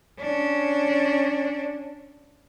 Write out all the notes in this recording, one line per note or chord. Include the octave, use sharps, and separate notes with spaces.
C#4 D4